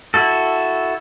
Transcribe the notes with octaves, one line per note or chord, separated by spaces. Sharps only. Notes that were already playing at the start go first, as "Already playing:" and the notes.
E4 F#4 A4